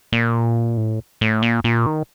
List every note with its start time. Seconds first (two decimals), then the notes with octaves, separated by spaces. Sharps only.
0.12 A#2
0.77 A2
1.21 A2
1.42 A#2
1.64 A#2
1.86 D#3